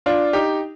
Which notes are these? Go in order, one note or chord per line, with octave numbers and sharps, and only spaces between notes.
D4 F4
D#4 G4